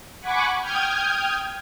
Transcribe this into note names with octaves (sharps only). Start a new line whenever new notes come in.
F#5 G#5 B5 C#6 D6
G5 D#6 F6 G6 G#6